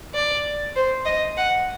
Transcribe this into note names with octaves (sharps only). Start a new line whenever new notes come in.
D5
C5
D#5
F#5